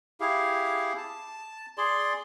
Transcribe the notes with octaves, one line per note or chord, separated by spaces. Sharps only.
E4 G4 G#4 F5
A5
G#4 D5 C6